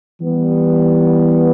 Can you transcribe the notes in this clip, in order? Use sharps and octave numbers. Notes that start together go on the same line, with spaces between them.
E3 G3 B3